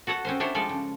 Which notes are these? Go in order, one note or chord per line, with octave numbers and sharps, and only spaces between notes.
F#4 A4 C#5 F#5
C4 C#4 C5
D4 E4 C5 C#5
F3 G3 G#3 A4 D5
C#3